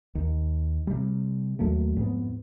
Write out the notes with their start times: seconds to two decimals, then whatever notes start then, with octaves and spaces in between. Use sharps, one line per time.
0.15 D#2
0.87 C3 G3
1.59 D#2 F#3 A3 A#3
1.97 F2 G#2 B3